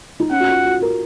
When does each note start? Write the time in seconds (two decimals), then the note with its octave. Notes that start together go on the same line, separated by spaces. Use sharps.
0.20 D#4
0.31 C#4 F#5
0.40 F#4
0.48 F4
0.65 F#4
0.82 A#4